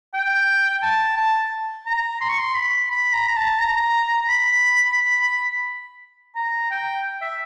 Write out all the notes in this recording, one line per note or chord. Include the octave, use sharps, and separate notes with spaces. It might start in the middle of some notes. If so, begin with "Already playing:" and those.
G5
A5
A5
A#5
C6
C#6
C6
B5
B5
A#5
A#5
A5
A#5
B5
B5
B5
A#5
G5
E5